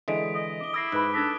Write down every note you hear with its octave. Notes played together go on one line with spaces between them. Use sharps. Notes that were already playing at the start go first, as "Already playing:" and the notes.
D3 E3 G#3 D#6 B6 D7
D#5
D6 G7
E4 E6 A#6 C7 D7
G#2 D#4 B4 B5 F#6
D4 A4 D#6 F#6 G#6 A#6 B6